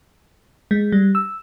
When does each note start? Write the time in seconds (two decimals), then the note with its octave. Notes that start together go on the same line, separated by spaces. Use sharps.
0.71 G#3
0.92 G3
1.15 E6